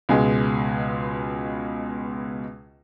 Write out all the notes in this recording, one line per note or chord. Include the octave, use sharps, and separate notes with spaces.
C#2 B2 G#3